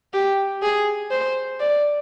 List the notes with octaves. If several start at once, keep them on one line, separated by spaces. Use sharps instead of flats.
G4
G#4
C5
D5